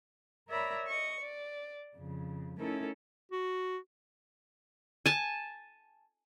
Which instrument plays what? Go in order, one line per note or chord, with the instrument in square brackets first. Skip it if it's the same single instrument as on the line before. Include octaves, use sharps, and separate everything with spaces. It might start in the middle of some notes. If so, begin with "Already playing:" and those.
[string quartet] A#4 C#5 D5 E5 A#5 B5
D#5 C#6
D5
F2 C#3
A3 C#4 D#4 E4 A4 A#4
[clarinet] F#4
[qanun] G#5 A5